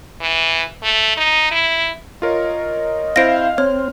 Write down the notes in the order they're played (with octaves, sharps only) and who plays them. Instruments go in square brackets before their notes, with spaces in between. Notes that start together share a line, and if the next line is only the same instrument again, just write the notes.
[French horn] E3
A3
D#4
E4
[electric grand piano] F4 A#4 C#5 [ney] D#5
[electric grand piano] C4 E4 C5 [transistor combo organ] F5 [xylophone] A#6 D7
[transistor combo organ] C4 [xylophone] C#5 [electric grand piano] F6